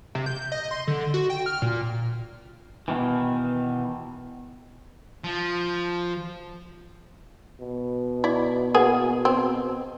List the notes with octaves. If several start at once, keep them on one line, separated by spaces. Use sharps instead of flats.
C3
G6
D#5
C6
D3
F#4
G5
F6
A#2
B2 D#3 E3
F3
B2
E4 D5
A#3 B3 G#4
C4